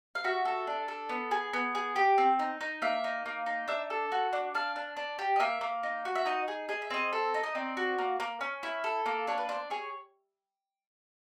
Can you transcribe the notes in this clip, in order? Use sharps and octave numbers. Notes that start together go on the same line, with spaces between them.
F5
F#4 E5
A4
D4
A4
B3
G#4
B3
G#4
G4
C4
D#4
D#4
A#3 E5
D#4
A#3
D#4
D4 E5
A4
F#4
D4
D4 F5
D4
D4
G4
D#5
A#3 E5
A#3
D#4
F#4
E5
D#4 D#5
G#4
G#4 D#5
E5
C4 D#5
A4
D#4
D#5
C4 D5
F#4
A#3
A#3
C#4
E4
A4
A#3
D4 C#5
B4
D4 C5
G#4 C#5